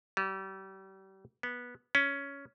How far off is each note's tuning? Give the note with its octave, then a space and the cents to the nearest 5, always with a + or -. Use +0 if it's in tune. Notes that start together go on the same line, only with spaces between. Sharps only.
G3 -35
B3 -15
C#4 +10